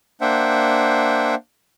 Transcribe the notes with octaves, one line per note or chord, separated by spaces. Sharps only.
A#3 D4 C5 E5 F#5 G5